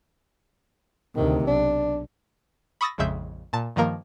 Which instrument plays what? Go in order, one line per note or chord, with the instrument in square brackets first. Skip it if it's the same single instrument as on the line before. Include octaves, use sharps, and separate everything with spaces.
[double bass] D2 C3 [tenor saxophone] D#3
[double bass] B1 [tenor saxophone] D4
[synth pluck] B5 C#6 D#6 E6 A6 A#6
A#1 F2 C#3 G#3 E5 G6
A#2 A5
G2 D#3 F3 A#3 A#4